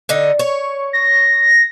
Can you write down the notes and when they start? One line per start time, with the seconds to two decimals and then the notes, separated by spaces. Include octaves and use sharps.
0.09 D3 D#4
0.39 C#5
0.93 A#6